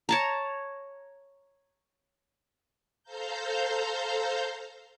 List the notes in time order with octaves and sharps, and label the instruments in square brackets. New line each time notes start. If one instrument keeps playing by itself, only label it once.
[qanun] C#5 A5 A#5
[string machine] A4 C5 F5 A#5 G6